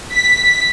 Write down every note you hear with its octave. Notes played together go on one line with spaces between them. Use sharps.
B6